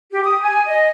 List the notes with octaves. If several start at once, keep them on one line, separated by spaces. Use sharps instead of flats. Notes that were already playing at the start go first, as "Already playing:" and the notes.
G4
D#6
G#5
D#5